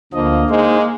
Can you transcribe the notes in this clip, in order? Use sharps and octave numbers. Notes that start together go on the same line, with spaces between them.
D2 D3 F3 A#3 D#5
G#3 D#4 C5